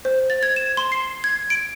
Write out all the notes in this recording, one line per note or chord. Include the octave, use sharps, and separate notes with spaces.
C5
A6
G#6
E7
C6
C7
G#6
D7